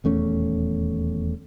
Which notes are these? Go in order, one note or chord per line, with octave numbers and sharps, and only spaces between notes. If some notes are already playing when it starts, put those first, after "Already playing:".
D#1 E2 A3 C#4